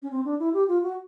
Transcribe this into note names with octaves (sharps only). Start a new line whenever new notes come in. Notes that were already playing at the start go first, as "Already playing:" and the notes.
C#4
C4
D4
E4
G4
F4
F#4